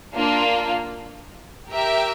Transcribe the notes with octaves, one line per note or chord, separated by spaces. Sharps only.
A#3 D4 F4
G4 A#4 E5 G5